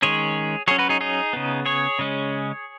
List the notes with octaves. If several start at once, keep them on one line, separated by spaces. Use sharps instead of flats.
D#3 G#3 C#4 G#4 C#5
F#3 C#4 G#4 C#5
F#4 B4
D#4 G#4
D#4 G#4
C#3 B3
G#4 C#5
C#3 G#3 C#4